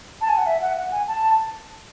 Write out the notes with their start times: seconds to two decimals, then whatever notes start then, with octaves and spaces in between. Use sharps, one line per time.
0.21 A5
0.29 G#5
0.37 F#5
0.47 E5
0.62 F#5
0.77 F#5
0.92 G#5
1.08 A5